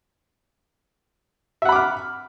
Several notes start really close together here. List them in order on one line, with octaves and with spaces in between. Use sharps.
E5 F#5 B5 D6 F6